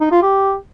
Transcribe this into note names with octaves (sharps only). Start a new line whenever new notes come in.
D#4
F4
G4